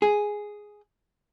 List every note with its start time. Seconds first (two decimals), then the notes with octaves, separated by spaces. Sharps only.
0.02 G#4